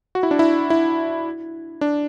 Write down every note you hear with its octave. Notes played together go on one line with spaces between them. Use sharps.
F#4
E4
D4
E4
E4
D4